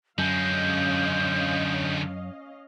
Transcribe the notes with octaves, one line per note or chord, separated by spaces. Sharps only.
F#2 D3 G#3 C#4 D#5 F5 G6